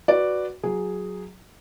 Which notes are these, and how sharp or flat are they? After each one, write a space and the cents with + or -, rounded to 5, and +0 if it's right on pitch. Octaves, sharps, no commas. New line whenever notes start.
F#4 +0 B4 +0 D5 +0
F#3 -5 G#4 +0